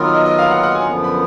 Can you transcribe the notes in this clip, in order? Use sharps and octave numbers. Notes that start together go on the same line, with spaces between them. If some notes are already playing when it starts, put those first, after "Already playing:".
Already playing: D#3 F#3 B3 F4 A#4
D#5
D#5
F5
F#5
F#5
G#5
F#2 D3 F3 B3
B5